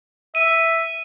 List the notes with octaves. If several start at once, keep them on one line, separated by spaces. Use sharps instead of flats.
E5 D#7